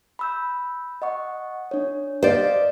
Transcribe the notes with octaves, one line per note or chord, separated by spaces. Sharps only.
B5 E6 G6
D#5 F#5 C#6
D4 C#5
C5 D5 D#5 F5